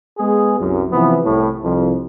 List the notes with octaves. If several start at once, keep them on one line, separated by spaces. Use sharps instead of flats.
G#3 B3 G#4
C2 F#2
C3 E3 F3 B3
C2 A2
C2 F2